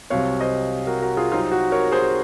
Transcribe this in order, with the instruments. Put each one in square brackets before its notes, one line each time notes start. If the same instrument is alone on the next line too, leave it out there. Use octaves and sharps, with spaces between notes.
[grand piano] C2 C3 F#3 C4 C#5 F5
C5 D#5
F#4 A#4
F#4 A#4
F4 G#4
C2 C3 F#3 C4 D#4 F4
F#4
A#4 C#5
G#4 C5